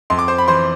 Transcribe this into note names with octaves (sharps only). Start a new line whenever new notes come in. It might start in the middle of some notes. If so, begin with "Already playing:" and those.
F2 C6
D6
C5 C6
B5
E3 C5 C6